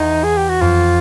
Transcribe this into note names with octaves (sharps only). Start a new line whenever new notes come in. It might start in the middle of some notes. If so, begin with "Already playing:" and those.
Already playing: E2 D#4
G#4
G4
F#4
F2 F4